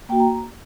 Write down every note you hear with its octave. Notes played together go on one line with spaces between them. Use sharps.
A#3 F#4 G5
A#5